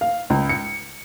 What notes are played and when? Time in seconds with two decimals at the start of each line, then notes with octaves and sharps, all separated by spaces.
0.01 F5
0.30 C#2
0.49 C#7